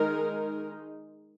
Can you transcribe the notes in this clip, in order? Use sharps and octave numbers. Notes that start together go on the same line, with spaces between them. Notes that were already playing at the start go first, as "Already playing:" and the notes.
Already playing: D#3 G#3 D#4 A#4